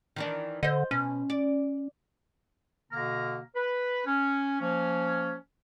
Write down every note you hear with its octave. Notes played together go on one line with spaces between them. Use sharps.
D#3 E3 D4
D3 C5 D#5
B2 C#4
D5
B2 D3 A#3 A#5 F6
B4
C#4
F3 A#3 C#4